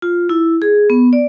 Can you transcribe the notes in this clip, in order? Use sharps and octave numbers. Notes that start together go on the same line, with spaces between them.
F4
E4
G#4
B3
D5